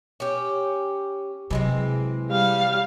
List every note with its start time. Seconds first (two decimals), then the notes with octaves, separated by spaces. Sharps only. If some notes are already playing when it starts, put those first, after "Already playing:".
0.20 C#4 G4
1.51 C3 E3 F#3 G#3 C4
2.31 G3 F5